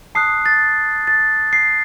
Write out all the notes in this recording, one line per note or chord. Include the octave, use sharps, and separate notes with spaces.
A5 D#6 F#6 C7
A6
A6
C7